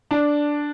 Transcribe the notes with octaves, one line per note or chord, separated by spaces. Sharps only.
D4